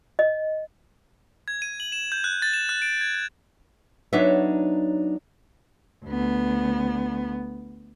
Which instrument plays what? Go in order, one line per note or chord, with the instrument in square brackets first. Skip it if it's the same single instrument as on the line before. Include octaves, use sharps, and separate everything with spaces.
[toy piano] D#5
[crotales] G#6
D#7
F#7
E7
G6
F#6
A6
E7
F#6
D7
G#6
G#6
[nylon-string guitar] F#3 B3 D4 D#4 C#5 E5
[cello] D2 B3